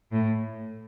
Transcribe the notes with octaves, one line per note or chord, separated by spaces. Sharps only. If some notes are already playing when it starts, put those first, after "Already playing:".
A2